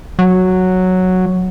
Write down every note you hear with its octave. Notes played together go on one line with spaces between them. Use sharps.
F#3